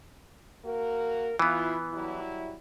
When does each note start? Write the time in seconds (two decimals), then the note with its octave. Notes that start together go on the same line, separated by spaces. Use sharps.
0.65 A#3 F#4 A#4
1.39 E3 B3 E4 F4
1.94 F#3 G3 E4